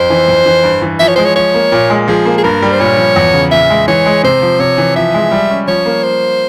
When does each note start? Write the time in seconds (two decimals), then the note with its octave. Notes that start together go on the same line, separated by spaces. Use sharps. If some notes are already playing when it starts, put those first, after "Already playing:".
Already playing: F2 C5
0.10 E3
0.28 F2
0.46 E3
0.63 G2
0.82 E3
1.00 F3 E5
1.08 C#5
1.16 G#3 C5
1.25 C#5
1.36 F3 C#5
1.54 A#3
1.72 A#2
1.90 G#3
2.08 F3 G#4
2.26 A#3
2.38 G#4
2.44 G2 A#4
2.62 G3
2.72 C5
2.80 A#2 C#5
2.98 F3
3.16 E2
3.34 C#3
3.51 A#2 E5
3.70 G#3
3.88 E3 C#5
4.06 G#3
4.23 C3 C5
4.42 F3
4.59 C3 C#5
4.78 E3
4.96 F3 E5
5.14 G#3
5.31 G3
5.50 C#4
5.67 F3 C#5
5.86 A#3
6.03 C5